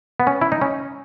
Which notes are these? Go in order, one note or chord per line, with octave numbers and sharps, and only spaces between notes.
B3
C#4
E4
D#4
C#4